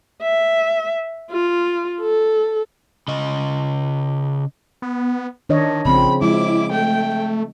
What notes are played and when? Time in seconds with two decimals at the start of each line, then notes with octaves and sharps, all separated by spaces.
0.22 E5
1.32 F4
2.01 A4
3.08 C#3 D#5
4.82 B3
5.49 D#3 D4 C#5 D#5
5.85 A#1 C#3 F3 C4 B5
6.22 F3 G#3 E4 D6
6.71 A3 G5